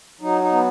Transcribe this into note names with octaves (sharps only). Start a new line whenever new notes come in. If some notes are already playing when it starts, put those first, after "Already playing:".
F#3 D#4
D#4
B3